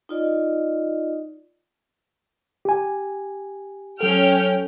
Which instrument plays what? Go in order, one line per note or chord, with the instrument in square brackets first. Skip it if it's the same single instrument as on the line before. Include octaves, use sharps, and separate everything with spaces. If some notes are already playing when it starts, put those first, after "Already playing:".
[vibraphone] D#4 F4 D5 D#5
[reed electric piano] G4 G#5
[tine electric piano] F#3 A4 [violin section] C#4 G5 F6